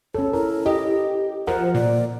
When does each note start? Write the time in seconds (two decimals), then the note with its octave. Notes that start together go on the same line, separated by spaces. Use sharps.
0.14 C#4 A4 C#5
0.33 E4 A#4
0.66 G4 D#5
1.47 F3 A#4 C5 F#5
1.74 A#2 D5